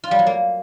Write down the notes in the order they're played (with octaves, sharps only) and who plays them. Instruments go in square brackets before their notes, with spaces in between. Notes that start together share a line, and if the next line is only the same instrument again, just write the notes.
[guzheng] F4
G3
F#3
A#3